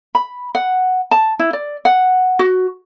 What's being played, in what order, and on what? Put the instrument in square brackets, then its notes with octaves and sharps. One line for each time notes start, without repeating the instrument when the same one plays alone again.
[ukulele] B5
F#5
A5
E4
D5
F#5
F#4